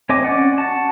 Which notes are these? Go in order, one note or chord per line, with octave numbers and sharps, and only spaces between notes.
C4 C#5 D#5 G#5 D6
C#4 D5 F#5
F#4 A5